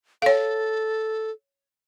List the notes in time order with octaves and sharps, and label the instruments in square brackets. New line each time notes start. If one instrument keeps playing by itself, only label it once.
[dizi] A4 [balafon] C#5 F5